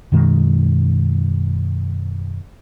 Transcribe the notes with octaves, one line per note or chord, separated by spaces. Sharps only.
F#2 B2 D#3 G#3